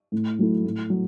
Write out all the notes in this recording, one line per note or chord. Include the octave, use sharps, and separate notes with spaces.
A2
F#3 A3 E4
A2
F#3